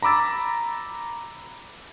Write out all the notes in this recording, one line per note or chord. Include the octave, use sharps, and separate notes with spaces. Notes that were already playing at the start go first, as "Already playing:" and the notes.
A#5 B5 D6 E6 A6